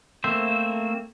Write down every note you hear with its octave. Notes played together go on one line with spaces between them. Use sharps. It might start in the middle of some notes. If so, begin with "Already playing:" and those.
A3 A#3 C4 C5 E5